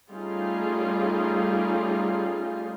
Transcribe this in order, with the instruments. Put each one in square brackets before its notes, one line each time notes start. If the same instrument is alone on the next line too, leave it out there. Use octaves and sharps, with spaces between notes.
[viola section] G3 A3 C#4 D#4 F4 G#4